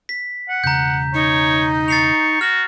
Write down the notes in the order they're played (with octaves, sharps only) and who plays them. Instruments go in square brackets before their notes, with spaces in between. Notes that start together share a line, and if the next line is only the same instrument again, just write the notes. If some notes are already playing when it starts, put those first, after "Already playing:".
[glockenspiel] B6
[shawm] F#5
[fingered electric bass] E1 C#3 [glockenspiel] A#5 G6
[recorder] D#4 [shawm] C#5
[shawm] C#6 [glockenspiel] A6 C7 F7
[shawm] F#4 [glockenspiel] F6